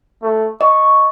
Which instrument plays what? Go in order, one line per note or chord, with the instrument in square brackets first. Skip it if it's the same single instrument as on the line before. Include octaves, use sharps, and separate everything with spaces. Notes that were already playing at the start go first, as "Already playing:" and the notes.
[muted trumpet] A3
[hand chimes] D#5 [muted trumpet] C#6